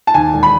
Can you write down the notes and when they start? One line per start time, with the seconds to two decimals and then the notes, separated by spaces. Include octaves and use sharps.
0.07 A5
0.14 D#2 G#5
0.34 E1
0.43 B5